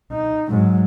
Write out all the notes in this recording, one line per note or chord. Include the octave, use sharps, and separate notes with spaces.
D#4
G#2 F#3